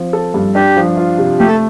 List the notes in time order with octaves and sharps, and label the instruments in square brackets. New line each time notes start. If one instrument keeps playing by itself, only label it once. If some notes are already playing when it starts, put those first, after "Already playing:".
Already playing: [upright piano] F3 C4
A4
G2
[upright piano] D4 [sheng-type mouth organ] G4
[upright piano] F3
F4
C3
[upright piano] A3 [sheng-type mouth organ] G4
[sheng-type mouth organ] A4